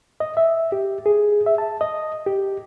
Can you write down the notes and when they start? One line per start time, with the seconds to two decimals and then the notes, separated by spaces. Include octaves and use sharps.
0.20 D#5
0.37 E5
0.72 G4
1.06 G#4
1.46 E5
1.58 A5
1.81 D#5
2.26 G4